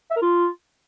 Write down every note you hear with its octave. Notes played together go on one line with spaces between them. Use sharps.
E5
A#4
F4